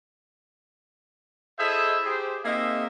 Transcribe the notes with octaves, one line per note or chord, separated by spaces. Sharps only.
E4 G#4 A4 C5 D#5 E5
G4 G#4 C5
A#3 C4 D#4 G#4 E5